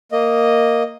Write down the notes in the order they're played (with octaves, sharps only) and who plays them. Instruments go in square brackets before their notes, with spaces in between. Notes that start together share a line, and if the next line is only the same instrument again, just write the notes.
[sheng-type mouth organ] A#3 D#5